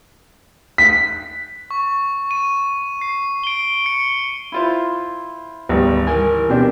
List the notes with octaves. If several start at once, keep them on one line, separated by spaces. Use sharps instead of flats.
B6
C#6
D#7
C7
D7 G7
C#7
E4 F4 C5
G#1 D2 G3 B3
E3 G3 A#4 G#5
B2 C4 D4 G4